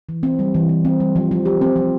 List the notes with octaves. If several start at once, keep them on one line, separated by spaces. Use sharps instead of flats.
E3
C4
G3
E3
E3
C4
G3
F3
F3
G4
C4
F3